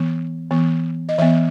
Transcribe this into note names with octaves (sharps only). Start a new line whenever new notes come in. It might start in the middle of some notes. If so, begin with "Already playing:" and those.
Already playing: E3 B3
E3 B3
D#5
E3 B3 E5